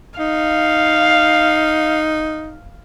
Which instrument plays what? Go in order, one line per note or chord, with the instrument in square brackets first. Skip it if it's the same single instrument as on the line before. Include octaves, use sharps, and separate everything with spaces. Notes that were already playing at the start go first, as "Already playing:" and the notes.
[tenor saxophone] D#4 [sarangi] F5